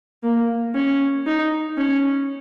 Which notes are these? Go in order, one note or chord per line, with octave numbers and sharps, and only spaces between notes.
A#3
C#4
D#4
C#4